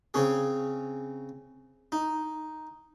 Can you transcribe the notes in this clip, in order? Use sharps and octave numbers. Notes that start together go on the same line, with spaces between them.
C#3 C4 C#4 G#4
D#4